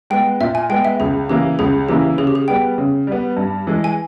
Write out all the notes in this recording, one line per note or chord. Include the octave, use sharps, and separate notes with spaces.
G#3 B3 G5
A#2 E5
G#5
G#3 B3 G5
E5
C#2 G#4
C#3 E3 A#3 E4 G4
C#2 G#4
C#3 E3 A#3 E4 G4
C#3 G#4
G4
G#4
G3 B3 G5
C#3
G3 B3
G2
E3 G#3
G#5